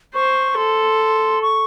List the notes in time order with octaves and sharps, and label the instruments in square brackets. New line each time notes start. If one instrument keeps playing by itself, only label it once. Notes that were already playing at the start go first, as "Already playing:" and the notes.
[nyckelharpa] C5 [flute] C#6
[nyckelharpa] A4 [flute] C6
[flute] C#6